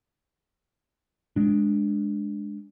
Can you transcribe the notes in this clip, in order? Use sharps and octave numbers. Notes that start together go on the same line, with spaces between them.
G#3 D4